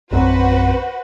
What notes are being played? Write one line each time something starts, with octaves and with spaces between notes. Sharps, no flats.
A#1 F#2 C4 F#4 B4 C5